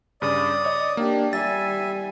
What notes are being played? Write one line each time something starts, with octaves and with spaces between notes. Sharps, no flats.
G2 C#3 D5 D#6
C#5 D#5
A#3 D4 G4
G3 E5 G#5 A6